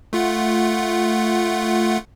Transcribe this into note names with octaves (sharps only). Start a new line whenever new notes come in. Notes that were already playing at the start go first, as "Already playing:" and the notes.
A3 F4 F#5